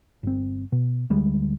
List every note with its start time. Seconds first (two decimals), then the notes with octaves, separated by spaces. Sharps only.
0.23 G1 C4
0.72 B2
1.10 D2 G3 G#3